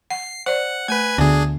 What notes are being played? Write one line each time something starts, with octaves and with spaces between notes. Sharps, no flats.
F#5 C7
C5 D5 F#5
A3 B4 G#5 G#6
D2 D3 B3 D4 G#4 G#5